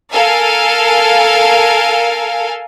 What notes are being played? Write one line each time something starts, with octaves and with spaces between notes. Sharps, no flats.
A4 A#4 F5 G#5